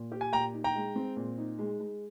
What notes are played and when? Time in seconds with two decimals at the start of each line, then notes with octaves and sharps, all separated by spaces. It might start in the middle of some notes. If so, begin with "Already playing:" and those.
Already playing: A#2
0.12 G4
0.21 G#5
0.33 A#2 G5 A#5
0.54 D#4
0.64 G5 A#5
0.75 G#3
0.96 C4
1.17 A#2
1.38 D#4
1.59 G#3
1.80 G#3